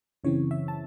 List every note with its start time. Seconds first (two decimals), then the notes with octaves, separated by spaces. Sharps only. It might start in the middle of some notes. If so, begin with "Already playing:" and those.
0.24 F#2 C#3 E3 C4 C#5
0.51 E5
0.68 A5